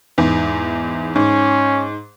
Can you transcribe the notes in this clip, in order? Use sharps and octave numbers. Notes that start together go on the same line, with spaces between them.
E2 G#2
G#2 C#4